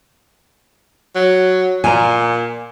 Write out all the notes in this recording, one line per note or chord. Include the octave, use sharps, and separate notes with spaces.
F#3
A#2 G#5 A#5